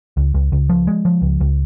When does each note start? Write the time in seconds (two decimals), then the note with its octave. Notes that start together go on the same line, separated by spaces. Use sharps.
0.17 C#2
0.34 C#2
0.52 C#2
0.69 F3
0.87 G#3
1.05 F3
1.22 C#2
1.40 C#2